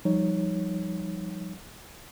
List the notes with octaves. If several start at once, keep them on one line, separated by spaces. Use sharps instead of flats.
F3 G3 D#4 C#5